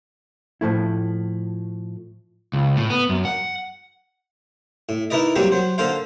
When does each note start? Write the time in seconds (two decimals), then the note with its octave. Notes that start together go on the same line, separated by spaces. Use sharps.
0.61 A2 F3 A3 E4
2.53 C#2
2.77 A2
2.90 B3
3.09 F#2
3.25 F#5
4.89 A2
5.10 D#4 E4 A#4 B4 D5 D#5
5.36 F#3 G3 A#3 C4 F#4 G4
5.52 F#3 C5
5.78 D3 A#3 A4 C5 F5